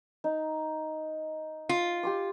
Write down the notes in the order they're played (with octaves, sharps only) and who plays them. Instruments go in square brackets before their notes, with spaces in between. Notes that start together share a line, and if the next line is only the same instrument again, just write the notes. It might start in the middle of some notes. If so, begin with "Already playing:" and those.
[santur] D#4
[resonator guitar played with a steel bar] F4
[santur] G4 C6 D6